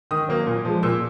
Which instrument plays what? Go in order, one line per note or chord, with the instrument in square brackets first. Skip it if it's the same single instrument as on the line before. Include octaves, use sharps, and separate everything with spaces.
[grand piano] D#3 D#6
F#3 A#3
A#2
F3 G#3
A#2 E6